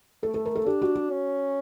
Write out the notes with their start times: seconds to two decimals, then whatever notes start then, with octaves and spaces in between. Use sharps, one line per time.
0.23 A3 A4
0.34 A4
0.45 A#4
0.55 A4
0.66 D4 G4
0.82 F#4
0.95 F#4
1.11 C#4